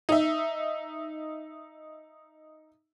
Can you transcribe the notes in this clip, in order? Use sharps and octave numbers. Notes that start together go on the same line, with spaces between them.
D#4 E5